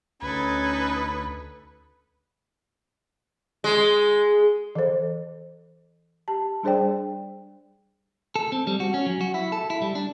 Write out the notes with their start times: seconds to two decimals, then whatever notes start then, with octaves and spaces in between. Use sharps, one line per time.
0.22 D2 C#4 D#4 A4 B4 G#6
3.64 G#3
4.75 E3 A4 C5
6.28 G4 A5
6.63 G3 D4 G#4 C5 D5 G5
8.35 A4
8.52 C4
8.67 G3
8.80 F#4
8.94 C#4
9.06 F#3
9.21 F#4
9.34 E4
9.52 A4
9.70 E4
9.82 G3
9.95 D4